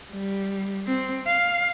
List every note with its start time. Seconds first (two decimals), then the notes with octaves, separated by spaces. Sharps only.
0.12 G3
0.87 C4
1.27 F5